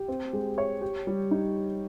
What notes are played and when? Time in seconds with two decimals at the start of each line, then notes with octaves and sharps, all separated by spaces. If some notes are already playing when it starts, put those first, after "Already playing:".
Already playing: G4
0.08 C4
0.33 G#3
0.58 C#5
0.81 G4
1.07 G3
1.31 D#4